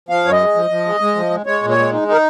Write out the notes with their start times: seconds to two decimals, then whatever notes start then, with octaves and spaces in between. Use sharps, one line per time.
0.09 F3 F5
0.24 F#2 C#5
0.32 D#5
0.40 G#3
0.55 F3
0.70 F3
0.86 G#3
1.00 G#3
1.16 F3
1.31 G#3
1.46 G#3 C#5
1.62 A#2
1.70 C#5
1.78 G#3
1.93 D#4
2.08 D#4 A#4